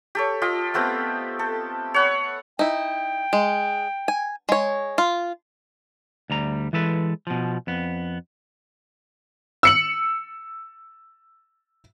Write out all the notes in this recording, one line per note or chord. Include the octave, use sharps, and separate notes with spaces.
G4 A4 C#5
F4 G4 D#5
A3 B3 C4 G4
A4
C#5 F#5 B5
D#4 E4 G5
G#3
G#5
G#3 C#5
F4
D2 G3 A#5
E3 G#3 A4 B4
B2 F3
F2 B3
E6 C#7 F#7